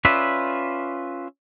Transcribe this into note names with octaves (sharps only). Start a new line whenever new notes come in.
C#4 F4 B4 D5 E5